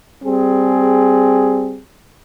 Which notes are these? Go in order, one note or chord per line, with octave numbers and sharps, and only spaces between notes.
G3 C4 G#4